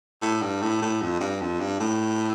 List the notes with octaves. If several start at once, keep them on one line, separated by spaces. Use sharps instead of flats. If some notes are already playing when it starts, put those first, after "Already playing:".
A2
G2
A2
A2
F2
G2
F2
G2
A2